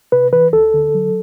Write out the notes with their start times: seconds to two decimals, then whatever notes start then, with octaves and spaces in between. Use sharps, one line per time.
0.12 C3 B4
0.32 E3 B4
0.53 D2 A4
0.74 D3
0.94 F#3